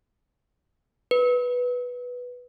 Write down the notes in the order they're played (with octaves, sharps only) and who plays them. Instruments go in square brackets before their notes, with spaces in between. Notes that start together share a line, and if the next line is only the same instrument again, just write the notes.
[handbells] B4